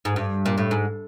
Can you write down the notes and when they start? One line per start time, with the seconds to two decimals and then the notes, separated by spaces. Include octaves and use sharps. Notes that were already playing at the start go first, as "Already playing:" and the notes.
0.05 G#2
0.16 G2
0.46 A#2
0.58 A2
0.71 G#2